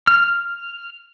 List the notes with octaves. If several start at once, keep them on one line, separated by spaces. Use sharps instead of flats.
F6